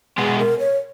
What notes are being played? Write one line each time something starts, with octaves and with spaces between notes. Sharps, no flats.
B2 G#3 B3 G#4
A#4
C#5